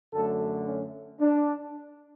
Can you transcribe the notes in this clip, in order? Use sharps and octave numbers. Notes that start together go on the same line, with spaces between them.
F#2 D3 F#3 A3 A4
C#4
D4